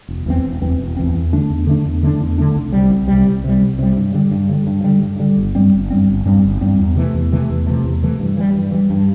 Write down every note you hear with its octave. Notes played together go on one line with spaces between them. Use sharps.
E1
E2 E3 C4
E1
E2 E3 C4
E1
E2 E3 C4
E2
D3 A3 D4
E2
D3 A3 D4
E2
D3 A3 D4
E2
D3 A3 D4
C2
C3 G3
C2
C3 G3
C2
C3 G3
C2
C3 G3
G2
D3 G3
G2
D3 G3
G2
D3 G3
G2
D3 G3
G1
G2 G3 C4
G1
G2 G3 C4
G1
G2 G3 C4
G1
G2 G3 C4
E2
C3 E3 A3
E2
C3 E3 A3
E2
C3 E3 A3
E2
C3 E3 A3
G2
E3 G3
G2
E3 G3
G2